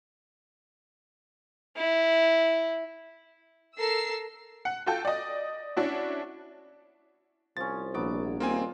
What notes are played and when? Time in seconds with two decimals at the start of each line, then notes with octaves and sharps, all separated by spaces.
1.77 E4
3.78 A4 A#4 E6 C7
4.65 F#5
4.86 F4 F#4 A4 G5 A5
5.05 D5 D#5
5.77 C#4 D4 E4 F#4
7.57 C2 F3 C#4 A6
7.94 A#1 F#3 B3 D6
8.40 D#1 A#3 C4 F4 G#5